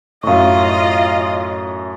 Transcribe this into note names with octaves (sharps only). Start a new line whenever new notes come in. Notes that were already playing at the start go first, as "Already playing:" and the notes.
F#2 A2 F4 D#5 F5 C#6